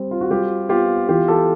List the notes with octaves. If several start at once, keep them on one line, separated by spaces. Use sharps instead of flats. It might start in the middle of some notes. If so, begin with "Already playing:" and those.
Already playing: G3 C4
F4
F#4
G3 F4 G4
B3 F4 G4
E3 F4 G4
G4 A4